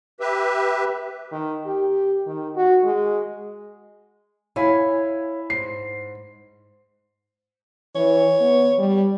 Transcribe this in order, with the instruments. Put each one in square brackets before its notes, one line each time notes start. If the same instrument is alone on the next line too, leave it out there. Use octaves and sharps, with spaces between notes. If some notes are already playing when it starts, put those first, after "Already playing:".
[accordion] G4 B4 E5
[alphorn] D#3
G4
D#3
F#4
G#3
[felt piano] E4 B5 [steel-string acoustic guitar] C#5 F5 G#5
[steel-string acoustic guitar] G#2 [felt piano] C7
[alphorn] E3 [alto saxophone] C#5
[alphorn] B3
G3